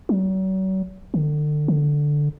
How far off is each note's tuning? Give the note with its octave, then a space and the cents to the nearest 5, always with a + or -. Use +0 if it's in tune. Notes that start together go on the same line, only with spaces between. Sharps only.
F#3 +40
D3 +30
D3 +0